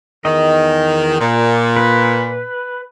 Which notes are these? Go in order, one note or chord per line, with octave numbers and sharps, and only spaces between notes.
E2 D#3 D#5
A#2
B4